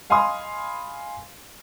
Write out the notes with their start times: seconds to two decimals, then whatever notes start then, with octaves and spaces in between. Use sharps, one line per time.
0.10 D#5 F5 G#5 B5 C6 D#6